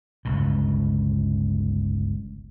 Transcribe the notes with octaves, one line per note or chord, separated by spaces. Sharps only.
G1 C#2 B2